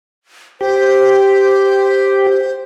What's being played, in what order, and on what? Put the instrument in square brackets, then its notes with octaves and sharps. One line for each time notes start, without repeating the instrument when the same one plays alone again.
[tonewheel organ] G4 [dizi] C5